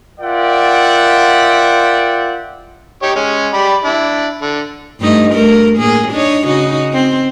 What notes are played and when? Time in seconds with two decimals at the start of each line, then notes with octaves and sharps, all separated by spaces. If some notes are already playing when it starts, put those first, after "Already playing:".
0.20 F4 A#4 D5 E5 F#5 G5
3.03 D#4 G4 C#5
3.15 G#3 C#4
3.53 G4 D5 B5
3.84 D4 E4
4.42 D3
5.00 G2 A3 D#4
5.31 A3 A#4
5.77 A2 A#3 G#4
6.11 D4 D#4 C#5
6.47 C#3 D#4 F#4
6.93 C4